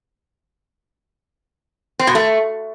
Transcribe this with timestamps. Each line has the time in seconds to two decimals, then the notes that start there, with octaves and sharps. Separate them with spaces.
1.99 C4
2.07 B2
2.15 A3